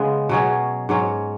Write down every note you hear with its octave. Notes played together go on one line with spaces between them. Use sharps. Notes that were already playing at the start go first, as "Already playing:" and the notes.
Already playing: C#3 G#3 B3
B2 F#3 C#4 G#4
G#2 F#3 C#4